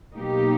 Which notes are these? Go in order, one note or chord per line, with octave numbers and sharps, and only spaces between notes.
B2 F#3 A#3 D#4 G4